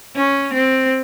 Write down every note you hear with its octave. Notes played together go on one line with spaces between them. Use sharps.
C#4
C4